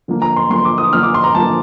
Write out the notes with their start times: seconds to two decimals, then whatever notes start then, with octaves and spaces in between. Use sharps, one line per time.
0.08 D3 F3 A#3
0.22 A#5
0.36 C6
0.50 D3 F3 A#3 C6
0.65 D6
0.78 D#6
0.93 D3 F3 A#3 F6
1.03 D6
1.14 C6
1.24 A#5
1.35 D3 F3 A#3 A5